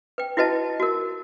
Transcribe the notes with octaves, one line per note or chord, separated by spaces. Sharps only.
B4 G5
E4 F#4 B4 D#5 A5
F#4 A#4